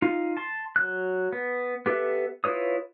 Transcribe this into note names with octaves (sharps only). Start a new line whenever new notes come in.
D#4 F4
A5 C6
F#3 F#6
B3
B3 G4 A4 B4 E5
E4 F4 B4 C#5 D#6